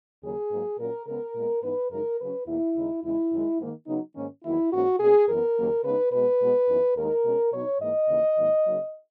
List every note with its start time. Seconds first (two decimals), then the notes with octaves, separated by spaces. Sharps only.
0.23 D#2 C#3 F#3 A#3 C#4 G#4
0.51 G#2 F#3 A#3
0.79 A#2 F#3 C#4 A#4
1.07 C#3 G#3 B3 A#4
1.35 A#2 G#3 B3
1.63 G#2 E3 B3 D#4 B4
1.91 F#2 C#3 G#3 D#4 A#4
2.20 C#3 F#3 C#4 B4
2.47 E2 B2 A#3 E4
2.76 D#2 C#3 G#3 D#4
3.03 E2 C#3 G#3 E4
3.32 F#2 D#3 G#3
3.60 G#2 D#3 A#3
3.87 C#3 F#3 B3 D#4
4.16 G#2 D#3 A#3 C#4
4.44 E2 D#3 F#3 A#3 E4
4.72 G#2 E3 A#3 C#4 F#4
5.00 B2 A#3 C#4 G#4
5.28 F#2 E3 B3 A#4
5.56 D#2 C#3 F#3 A#3
5.84 C#3 G#3 B3 D#4 B4
6.12 B2 G#3 B3 B4
6.41 B2 G#3 B3
6.68 F#2 E3 B3 D#4
6.96 D#2 D#3 G#3 D#4 A#4
7.24 B2 G#3 C#4
7.52 B2 F#3 B3 D#4 C#5
7.80 G#2 E3 A#3 D#5
8.09 D#2 C#3 E3 A#3
8.37 G#2 D#3 F#3 A#3
8.66 C#3 F#3 A#3 D#4